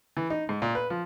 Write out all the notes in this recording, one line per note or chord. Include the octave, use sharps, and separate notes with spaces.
E3
D#4
G#2
A#2
B4
F3